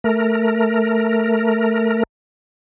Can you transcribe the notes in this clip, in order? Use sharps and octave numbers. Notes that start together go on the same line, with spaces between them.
A3 A#4